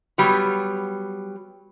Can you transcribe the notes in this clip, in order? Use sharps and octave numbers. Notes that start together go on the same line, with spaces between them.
F#3 G3 B3